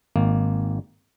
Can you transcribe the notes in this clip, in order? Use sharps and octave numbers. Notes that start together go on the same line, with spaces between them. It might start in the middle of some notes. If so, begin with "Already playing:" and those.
G#1 A#3